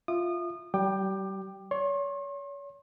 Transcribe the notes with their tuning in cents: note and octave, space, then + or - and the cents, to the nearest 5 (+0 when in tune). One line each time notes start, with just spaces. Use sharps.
F4 +0 E5 +0 D#6 -30
G3 -35 G5 +0 D6 +25
C#5 +35 C6 +45